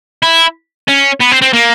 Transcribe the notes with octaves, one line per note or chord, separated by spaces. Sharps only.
E4
C#4
B3
C4
C4
A#3